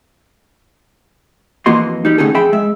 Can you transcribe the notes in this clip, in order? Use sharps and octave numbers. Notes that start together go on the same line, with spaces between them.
F2 E3 A#3 F#4 D#5 C6
G3 D#4
A2 D3 C#4 D#4 G#4 A4
F2 G#4 E5 G5 B5
G#3 E5